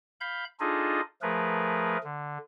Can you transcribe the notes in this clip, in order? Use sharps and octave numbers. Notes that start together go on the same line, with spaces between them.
F5 B5 G6
D4 D#4 F4 G#4 A4 D#5
F3 A3 G#4 A#4 B4
D3